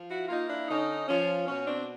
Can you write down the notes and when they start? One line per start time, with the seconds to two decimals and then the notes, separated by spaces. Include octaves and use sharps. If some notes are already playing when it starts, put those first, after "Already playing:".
Already playing: F3
0.09 E4 F#4
0.28 A#3 D#4 F4
0.49 D4 E4
0.68 D3 C#4 D#4
1.08 F3 C#4
1.46 B2 C#4
1.66 C4 D4